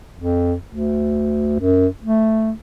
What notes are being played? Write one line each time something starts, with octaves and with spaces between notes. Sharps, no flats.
F2
D2
F#2
A3